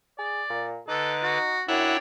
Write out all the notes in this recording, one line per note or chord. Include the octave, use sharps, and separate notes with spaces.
G#4 D5
A#2
D3 D#4 A4 B4 D6
F#4
F#2 D4 E4 C#5 F#5 G5 A#5